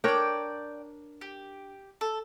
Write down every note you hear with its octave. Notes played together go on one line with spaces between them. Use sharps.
D4 A#4 C#5 D5 G5
G4
A4